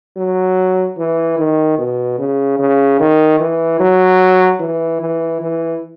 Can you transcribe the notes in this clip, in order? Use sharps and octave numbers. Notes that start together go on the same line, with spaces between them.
F#3
E3
D#3
B2
C#3
C#3
D#3
E3
F#3
E3
E3
E3